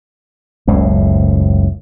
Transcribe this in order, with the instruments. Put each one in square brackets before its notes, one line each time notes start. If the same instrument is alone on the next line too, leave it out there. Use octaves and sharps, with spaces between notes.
[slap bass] F#1 C#2 A2